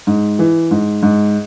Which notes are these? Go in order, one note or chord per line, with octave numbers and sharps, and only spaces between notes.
G#2
E3
G#2
G#2